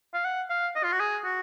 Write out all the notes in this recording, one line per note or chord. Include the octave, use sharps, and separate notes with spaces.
F5
F#5
F5
D#5
F4
F#4
G#4
F#4